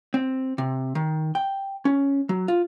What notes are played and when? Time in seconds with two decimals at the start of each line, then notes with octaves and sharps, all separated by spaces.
0.14 C4
0.58 C3
0.95 D#3
1.35 G5
1.85 C#4
2.29 F#3
2.48 F4